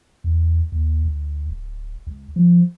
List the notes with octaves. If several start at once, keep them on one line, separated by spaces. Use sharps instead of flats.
E2
D#2
D2
D1
C#2
F3